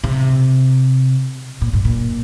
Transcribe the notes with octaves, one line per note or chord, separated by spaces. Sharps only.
C3
A#2
G2
A#2